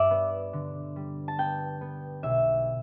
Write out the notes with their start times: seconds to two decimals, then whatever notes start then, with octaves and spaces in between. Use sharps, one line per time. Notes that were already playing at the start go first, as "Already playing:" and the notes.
Already playing: G2 D5 E5
0.11 B3
0.53 D3
0.96 G3
1.28 A5
1.38 B3 G5
1.81 B3
2.23 B1 E5